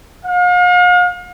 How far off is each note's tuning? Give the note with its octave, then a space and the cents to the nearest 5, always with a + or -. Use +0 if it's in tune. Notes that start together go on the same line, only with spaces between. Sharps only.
F5 +40